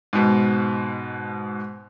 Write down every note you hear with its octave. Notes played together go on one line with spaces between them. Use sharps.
G#2 B2